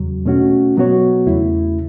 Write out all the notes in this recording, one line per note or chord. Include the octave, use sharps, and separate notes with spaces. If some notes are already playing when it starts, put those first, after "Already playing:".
Already playing: E2 C#3 F#3
B2 A3 C#4 F#4
B2 F#3 B3 F#4 C#5
E2 C#3 A3 E4